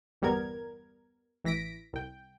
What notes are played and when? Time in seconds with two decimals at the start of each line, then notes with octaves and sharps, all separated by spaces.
0.22 G1 E2 G3 B3 A#4 G#6
1.44 A1 E3 A#6 B6 D7
1.93 C2 G5